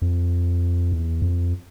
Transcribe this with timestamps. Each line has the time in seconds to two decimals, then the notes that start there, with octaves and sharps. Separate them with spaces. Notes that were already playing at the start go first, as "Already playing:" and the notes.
0.02 F2
0.92 E2
1.22 F2